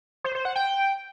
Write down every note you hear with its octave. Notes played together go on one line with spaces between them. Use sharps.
C5
C5
F#5
G5